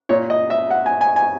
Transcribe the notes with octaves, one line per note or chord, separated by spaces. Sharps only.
A#2 C#5
D#5
E5
F#5
G#5
G#5
G#5